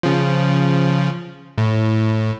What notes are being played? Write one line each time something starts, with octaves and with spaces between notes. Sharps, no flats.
C#3 F3
A2